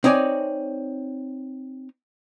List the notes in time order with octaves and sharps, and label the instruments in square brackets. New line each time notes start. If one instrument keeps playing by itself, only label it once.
[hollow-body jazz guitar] C4 D#4 C#5 D5 G#5